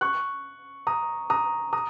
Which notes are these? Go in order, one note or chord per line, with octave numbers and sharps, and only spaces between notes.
C#6 F#6
A#5 D#6
A#5 D#6
A#5 D#6